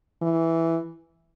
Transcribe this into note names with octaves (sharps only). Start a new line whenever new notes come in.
E3